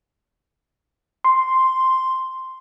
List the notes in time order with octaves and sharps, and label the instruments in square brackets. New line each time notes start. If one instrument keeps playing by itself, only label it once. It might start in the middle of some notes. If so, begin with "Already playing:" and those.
[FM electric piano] C6